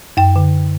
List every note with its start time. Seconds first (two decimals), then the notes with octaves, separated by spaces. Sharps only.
0.17 F#2 G5
0.36 D3